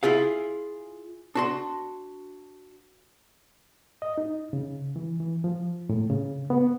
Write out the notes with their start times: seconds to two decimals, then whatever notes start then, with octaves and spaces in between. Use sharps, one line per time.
0.03 E4 F4 G#4 F5
1.35 D4 F#4 C6
4.02 D#5
4.18 D#4
4.53 C#3
4.96 E3
5.20 E3
5.44 F3
5.89 A2
6.10 C#3
6.50 B3